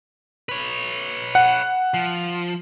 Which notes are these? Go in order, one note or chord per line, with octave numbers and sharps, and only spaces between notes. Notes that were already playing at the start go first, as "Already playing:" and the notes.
B4 C#5
F#5
F3